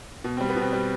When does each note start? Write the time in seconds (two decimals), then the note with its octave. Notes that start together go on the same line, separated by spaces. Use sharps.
0.24 B2
0.37 G3 C4
0.49 B3
0.56 B2
0.61 C4
0.73 G3